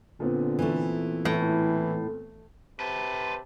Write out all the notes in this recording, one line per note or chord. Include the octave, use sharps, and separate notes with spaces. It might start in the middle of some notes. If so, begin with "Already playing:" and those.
A#2 D3 B3 C4
E3 A3
A2 E3 A3
C3 B4 C5 A5